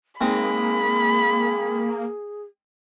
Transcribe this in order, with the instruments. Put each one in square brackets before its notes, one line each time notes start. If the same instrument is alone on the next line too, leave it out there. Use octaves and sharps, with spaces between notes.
[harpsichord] G#3 C4 D#4 [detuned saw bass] A#3 [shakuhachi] G#4 [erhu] B5